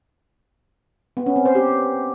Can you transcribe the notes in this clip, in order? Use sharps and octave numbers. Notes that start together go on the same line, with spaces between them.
B3
C#4
C4
C5
G4